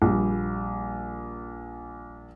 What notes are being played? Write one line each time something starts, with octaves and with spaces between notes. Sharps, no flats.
A#1 G3